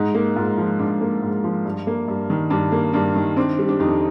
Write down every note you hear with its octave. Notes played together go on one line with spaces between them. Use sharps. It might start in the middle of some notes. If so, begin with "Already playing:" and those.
Already playing: G#2 D#4
A#3
G#2 F4
F3
G#2 D4
A#3
G#2
F3
G2
A#3
G2
D#3
G2 D4
A#3
G2 D4
D#3
C4 D4
G3
D4
F2 D#4